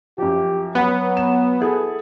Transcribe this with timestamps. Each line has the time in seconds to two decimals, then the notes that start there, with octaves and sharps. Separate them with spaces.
0.18 F#2 F3 G4
0.75 F#3 B3 F#5 B5
1.17 E7
1.60 E4 G#4 A4